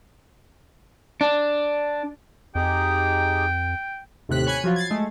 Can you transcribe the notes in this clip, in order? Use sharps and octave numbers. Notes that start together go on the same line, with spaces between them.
D4
F2 D#4 G4 G#4 G5
D#2 A2 C3 F#6 B6
C#5 G#5 B5 F#6 G#6
F3 F#3 F4
G#6 A6 C7
G#3 A3